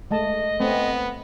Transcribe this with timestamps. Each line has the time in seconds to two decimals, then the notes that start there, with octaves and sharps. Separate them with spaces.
0.11 G#3 A3 D#5 A5
0.60 A3 B3 C4